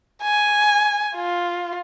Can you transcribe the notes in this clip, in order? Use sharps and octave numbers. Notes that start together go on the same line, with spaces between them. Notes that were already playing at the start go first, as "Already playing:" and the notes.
G#5
F4